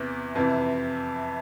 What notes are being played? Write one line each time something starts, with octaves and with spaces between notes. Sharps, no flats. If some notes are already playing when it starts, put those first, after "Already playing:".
Already playing: E2 C3 E3
F2 C3 E3